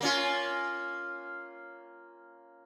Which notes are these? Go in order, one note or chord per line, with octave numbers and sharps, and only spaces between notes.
A#3 C#4 F4